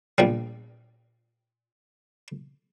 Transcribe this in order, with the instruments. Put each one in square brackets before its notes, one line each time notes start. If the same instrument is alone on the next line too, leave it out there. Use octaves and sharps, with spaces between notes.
[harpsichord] A#1 F3 G3